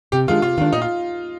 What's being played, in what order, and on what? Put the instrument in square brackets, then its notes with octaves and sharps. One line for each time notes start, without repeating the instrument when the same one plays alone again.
[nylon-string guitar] C3 [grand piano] G4
[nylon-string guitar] D#3 G#3 D4 [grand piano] F4
[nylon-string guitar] C3 [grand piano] F4
[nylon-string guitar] D#3 [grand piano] F4
[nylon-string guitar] G#3 D4
[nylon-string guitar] A#2 [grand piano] D#4
[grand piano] F4